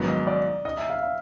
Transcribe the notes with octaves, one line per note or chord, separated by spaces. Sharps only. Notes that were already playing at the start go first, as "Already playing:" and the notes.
Already playing: A#1 G#2 D#3 F#3 B3
D#5
D5
D#5
E5
F5
F5